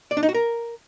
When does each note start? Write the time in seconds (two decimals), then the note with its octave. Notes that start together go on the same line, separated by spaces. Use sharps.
0.11 D5
0.17 D4
0.23 D#4
0.29 F#4
0.34 A#4